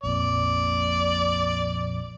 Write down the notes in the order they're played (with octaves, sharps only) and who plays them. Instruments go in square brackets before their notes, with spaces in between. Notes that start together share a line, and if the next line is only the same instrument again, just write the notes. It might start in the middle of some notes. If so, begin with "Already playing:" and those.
[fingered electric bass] A#1 F2 A#2 [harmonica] D5